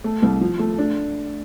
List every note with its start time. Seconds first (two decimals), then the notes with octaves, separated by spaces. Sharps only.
0.04 A3
0.22 C2
0.41 F3
0.59 A3
0.78 D4